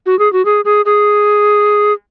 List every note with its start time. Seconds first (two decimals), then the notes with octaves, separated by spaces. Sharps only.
0.06 F#4
0.19 G#4
0.33 F#4
0.45 G#4
0.65 G#4
0.85 G#4